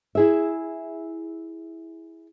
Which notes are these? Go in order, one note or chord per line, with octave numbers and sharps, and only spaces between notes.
E4 G#4 E5